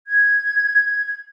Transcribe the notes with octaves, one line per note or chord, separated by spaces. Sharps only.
G#6